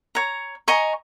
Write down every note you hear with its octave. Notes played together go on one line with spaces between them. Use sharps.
C#5 A#5
D#5 G#5 A#5 C#6